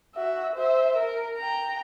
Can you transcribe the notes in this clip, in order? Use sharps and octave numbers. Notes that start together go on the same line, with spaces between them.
F#4 E5
C5 E5
A#4
G5 A#5